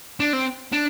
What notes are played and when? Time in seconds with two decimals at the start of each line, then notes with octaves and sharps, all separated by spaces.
0.20 D4
0.33 C4
0.73 D4